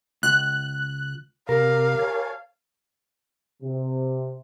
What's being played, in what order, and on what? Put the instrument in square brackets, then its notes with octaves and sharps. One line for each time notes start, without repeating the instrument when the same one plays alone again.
[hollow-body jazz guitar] C#2 [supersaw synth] F#6
[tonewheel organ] C3 [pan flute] G4 [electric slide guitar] A#4 [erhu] F5
[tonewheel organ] C#5 G#5 A5
[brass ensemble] C3